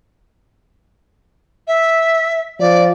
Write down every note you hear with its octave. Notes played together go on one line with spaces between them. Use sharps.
E5
F3 D5